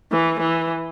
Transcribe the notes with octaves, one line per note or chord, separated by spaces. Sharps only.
E3
E3